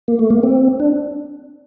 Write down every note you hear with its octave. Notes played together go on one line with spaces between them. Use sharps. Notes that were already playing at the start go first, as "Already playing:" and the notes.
A#3
A3
A#3
C4
D4